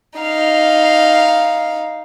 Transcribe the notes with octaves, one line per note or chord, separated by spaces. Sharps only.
D#4 F5